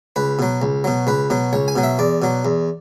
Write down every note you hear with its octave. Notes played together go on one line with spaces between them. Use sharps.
C#2 B4
B2 F#3
C#2
B2 F#3
C#2 B4
B2 F#3
C#2 C#5
G#5
B2 F#3
E5
E2 D5
B2 F#3
E2